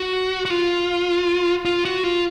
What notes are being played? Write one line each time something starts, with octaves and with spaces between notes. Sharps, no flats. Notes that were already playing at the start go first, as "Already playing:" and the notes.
Already playing: F#4
F#4
F4
F4
F#4
F4